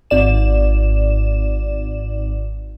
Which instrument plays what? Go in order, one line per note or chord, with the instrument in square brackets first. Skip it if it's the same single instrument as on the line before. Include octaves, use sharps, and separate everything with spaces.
[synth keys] G#1 D5 E7